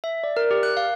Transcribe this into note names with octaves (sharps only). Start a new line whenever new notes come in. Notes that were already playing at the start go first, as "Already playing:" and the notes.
E5
D5
A#4
G4
F#6
F5